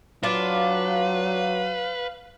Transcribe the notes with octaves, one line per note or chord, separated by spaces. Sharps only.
F#3 D4 F4 B4 F5